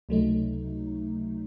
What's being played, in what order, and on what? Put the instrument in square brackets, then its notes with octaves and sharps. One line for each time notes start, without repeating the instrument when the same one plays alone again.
[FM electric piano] C#2 C3 F#3 A3 D#4